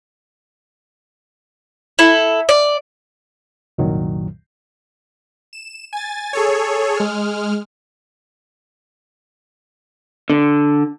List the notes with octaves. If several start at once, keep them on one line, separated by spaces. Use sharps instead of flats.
E4 A4
D5
C2 F#2 A#2 D#3 F#3
E7
G#5 A6
G#4 A4 C#5
G#3 F6
D3